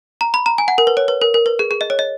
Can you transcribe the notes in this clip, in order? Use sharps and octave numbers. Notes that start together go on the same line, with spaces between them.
A#5
B5
A#5
G#5
F#5
A#4
B4
C#5
B4
A#4
A#4
B4
G#4
G#4
D#5
C#5
D#5